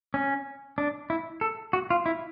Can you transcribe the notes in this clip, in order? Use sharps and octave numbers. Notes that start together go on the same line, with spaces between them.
C#4
D4
E4
A4
F#4
F4
E4